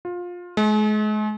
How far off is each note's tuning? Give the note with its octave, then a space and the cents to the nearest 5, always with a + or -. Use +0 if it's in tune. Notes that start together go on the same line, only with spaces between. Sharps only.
F4 +20
G#3 +40